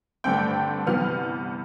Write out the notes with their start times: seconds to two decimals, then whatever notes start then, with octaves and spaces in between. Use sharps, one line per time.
0.24 G2 D3 A3 C4 G5
0.86 C2 C3 E3 B3 F6